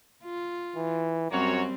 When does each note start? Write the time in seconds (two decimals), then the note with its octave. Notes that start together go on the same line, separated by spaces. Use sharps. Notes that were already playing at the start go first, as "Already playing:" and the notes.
0.24 F4
0.76 E3
1.31 F#2 G3 A#3 C4 F#4 C#5